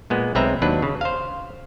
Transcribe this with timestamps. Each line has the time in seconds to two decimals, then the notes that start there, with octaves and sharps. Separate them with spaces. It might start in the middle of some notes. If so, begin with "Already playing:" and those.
0.10 A#2 G#3 B3
0.35 B1 G#3 C4 B4 E5 A#5
0.62 D#2 F#3 D4 B4
0.82 C#3
1.01 C5 F5